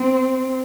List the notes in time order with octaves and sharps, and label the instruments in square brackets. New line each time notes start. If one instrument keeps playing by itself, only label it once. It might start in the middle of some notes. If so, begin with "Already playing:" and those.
Already playing: [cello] C4